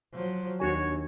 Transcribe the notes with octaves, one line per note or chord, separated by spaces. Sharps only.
F3 F#3
D#2 D4 F#4 C#5 G#5